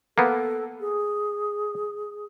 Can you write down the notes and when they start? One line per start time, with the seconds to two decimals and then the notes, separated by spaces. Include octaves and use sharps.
0.18 A#3 B3 A4
0.80 G#4